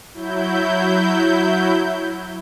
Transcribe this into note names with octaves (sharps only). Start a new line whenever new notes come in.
F#3 E4 G6